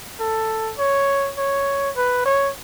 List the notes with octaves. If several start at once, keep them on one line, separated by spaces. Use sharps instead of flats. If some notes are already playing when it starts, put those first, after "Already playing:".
A4
C#5
C#5
B4
C#5